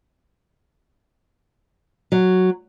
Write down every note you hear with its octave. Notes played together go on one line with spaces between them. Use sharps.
F#3